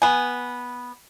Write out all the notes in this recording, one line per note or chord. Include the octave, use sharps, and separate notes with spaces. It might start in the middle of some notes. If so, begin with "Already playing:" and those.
B3 G#5